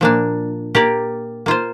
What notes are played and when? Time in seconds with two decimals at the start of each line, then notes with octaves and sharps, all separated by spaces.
0.01 A#2 F3 A#3 D4
0.75 A#3 G4 A#4 D5
1.46 A#3 F4 C5